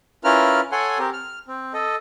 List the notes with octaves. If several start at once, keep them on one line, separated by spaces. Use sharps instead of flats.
C#4 E4 F4 A#4 B4 F6
A4 C#5 F#5 G#5 C6
C4 G4 A#4
F6
C4
A4 D#5